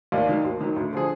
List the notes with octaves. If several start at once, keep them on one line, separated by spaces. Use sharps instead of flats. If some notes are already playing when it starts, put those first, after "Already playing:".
D#2 D5 F5
D#3 F#3
D#2
D#3 F#3
D2
D3 F3 G#4